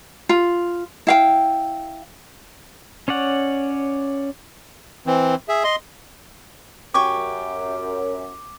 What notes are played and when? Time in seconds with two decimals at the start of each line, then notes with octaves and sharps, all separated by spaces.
0.29 F4
1.07 E4 F5 G5
3.08 C#4 C#5 D5 F#5
5.07 E3 C4
5.49 G#4 E5
5.64 D#5 C6
6.94 F#2 G4 G#5 C#6 D6